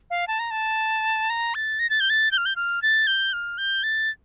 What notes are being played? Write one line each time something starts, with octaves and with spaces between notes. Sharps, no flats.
F5
A5
A#5
A5
A#5
A6
A#6
A6
G6
A6
G6
F6
G6
F6
A6
G6
F6
G6
A6